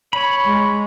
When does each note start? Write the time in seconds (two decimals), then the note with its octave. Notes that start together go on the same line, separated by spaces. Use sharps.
0.13 C#5 B5
0.45 G#3